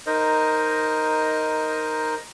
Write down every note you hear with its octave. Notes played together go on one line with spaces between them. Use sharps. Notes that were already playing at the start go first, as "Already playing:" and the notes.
D#4 A#4 C5 D#5